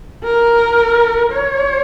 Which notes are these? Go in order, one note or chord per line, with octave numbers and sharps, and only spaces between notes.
A#4
C#5